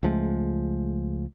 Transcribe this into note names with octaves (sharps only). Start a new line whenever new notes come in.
C#2 F3 G#3 A3